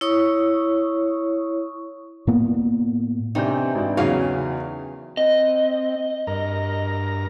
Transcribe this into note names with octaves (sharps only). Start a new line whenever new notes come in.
E4 C#5 C#6 D#6
A2 A#3 B3
C3 D#3 E3 C4 D4 D#4 G5
G#1 D4
E2 C#3 F#3 D#4 G#4 F5
C4 D#5
G2 A#4 A#5